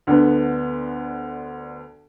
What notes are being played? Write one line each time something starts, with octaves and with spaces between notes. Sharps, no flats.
D2 D3 B3